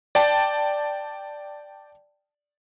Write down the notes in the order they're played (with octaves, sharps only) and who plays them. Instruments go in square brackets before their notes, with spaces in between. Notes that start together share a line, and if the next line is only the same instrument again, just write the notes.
[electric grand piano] D5 G5 A5